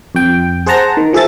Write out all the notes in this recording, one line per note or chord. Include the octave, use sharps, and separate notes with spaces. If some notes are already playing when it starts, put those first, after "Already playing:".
F2 G5
G#4 C5 F#5 A5 A#5
D#3
F3 G#4 A4 E5 A6